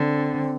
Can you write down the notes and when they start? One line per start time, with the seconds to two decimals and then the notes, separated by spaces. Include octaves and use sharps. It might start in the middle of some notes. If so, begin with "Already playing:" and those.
Already playing: D3 C4